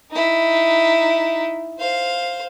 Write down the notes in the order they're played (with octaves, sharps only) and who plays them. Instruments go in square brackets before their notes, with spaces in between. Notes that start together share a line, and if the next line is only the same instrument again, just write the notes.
[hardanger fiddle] D#4 E4
C5 F5